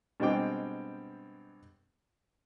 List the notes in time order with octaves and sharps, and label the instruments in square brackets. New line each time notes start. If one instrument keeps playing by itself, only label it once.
[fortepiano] G2 B2 G#3 C4 G5 D6